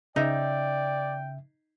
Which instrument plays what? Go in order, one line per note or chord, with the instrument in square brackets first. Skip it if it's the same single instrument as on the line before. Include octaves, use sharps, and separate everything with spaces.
[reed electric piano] C#3 E5 [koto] D#4 [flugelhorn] D5 [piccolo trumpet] G5